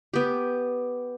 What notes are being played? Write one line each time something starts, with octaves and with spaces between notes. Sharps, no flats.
B3 G4